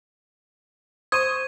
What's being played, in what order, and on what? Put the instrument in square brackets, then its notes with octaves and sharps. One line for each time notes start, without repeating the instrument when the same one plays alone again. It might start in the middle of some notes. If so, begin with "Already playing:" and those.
[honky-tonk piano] C5 C#6 D#6 [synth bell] G#6 D#7